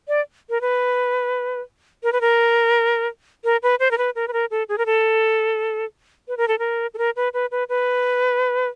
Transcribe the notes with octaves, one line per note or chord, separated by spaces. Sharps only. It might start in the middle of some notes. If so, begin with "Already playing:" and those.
D5
A#4
B4
A#4
B4
A#4
A#4
B4
C5
A#4
B4
A#4
B4
A#4
A4
G#4
A#4
A4
B4
A#4
A4
A#4
A4
A#4
B4
B4
B4
B4